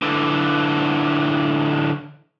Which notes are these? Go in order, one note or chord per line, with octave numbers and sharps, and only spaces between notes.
D3 E3